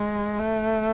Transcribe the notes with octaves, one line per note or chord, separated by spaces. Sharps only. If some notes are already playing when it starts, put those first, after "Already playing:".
Already playing: G#3
A3